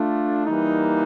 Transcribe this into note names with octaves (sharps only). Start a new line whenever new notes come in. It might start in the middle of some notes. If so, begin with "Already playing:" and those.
Already playing: A3 D4 F4
E3 G3 A#3 D#4